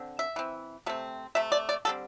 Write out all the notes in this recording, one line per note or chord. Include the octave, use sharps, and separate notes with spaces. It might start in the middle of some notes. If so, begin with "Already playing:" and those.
Already playing: D3 C4
E5
E3 C4
C3 A3 C4
C3 A3 E5
D5
D5
D3 G3 C4 A4